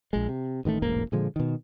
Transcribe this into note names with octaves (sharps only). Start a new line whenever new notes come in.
A#1 G#3
C3
A1 D#3 G3 A3
E1 A1 G#2 A#3
A#2 D3 F3 G#3
B2 D#3